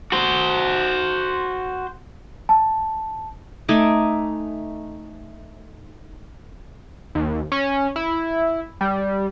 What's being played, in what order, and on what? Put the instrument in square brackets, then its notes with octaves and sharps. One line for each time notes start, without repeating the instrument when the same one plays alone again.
[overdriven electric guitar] F#4 C5
[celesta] A5
[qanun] A3 D#4 G#5 D6
[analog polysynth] D#2
C#4
E4
G3